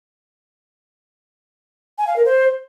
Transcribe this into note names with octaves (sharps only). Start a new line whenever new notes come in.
G#5
F5
A#4
C5